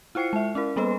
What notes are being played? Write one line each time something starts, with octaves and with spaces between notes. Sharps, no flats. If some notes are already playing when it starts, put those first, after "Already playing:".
E4 F4 C5 G5 C7 C#7
G#3 E5
C#4 E4 A#4
G3 A#3 B3 A4 B4 D#5